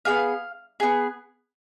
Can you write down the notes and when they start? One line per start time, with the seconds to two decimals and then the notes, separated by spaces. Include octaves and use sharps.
0.05 B3 D#4 G#4 F5
0.80 B3 D#4 G#4